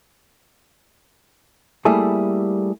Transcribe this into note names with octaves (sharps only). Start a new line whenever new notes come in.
G3 A3 A#3 E4 G#4 A4